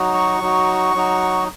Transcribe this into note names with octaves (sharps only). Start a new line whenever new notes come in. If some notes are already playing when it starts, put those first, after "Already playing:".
Already playing: F#3 D#4 F#4
C#6
F#3 D#4 F#4
F#3 D#4 F#4